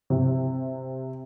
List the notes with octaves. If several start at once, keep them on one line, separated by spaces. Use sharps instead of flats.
C3